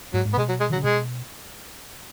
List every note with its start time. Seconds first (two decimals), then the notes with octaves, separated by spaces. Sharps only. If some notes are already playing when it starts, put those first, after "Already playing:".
0.14 G#2 F#3
0.25 G#2
0.33 B3
0.37 B2 G#3
0.49 F#3
0.60 G#3
0.70 D#3 F#3
0.76 C#3
0.83 B2 G#3